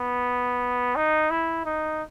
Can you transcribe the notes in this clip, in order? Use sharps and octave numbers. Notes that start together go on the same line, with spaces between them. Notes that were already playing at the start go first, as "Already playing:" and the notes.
Already playing: B3
D#4
E4
D#4